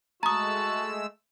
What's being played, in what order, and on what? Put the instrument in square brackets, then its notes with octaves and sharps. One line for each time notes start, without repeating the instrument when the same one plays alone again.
[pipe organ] G#3 A3 E6 [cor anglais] F#4 [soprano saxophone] A5 [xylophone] A#5 D#6